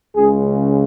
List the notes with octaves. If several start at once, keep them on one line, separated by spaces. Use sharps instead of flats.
C#2 C#3 G#3 G#4